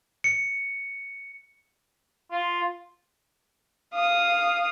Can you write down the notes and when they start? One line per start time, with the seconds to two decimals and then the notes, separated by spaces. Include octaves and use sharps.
0.24 C#7
2.31 F4
3.94 F5 D#6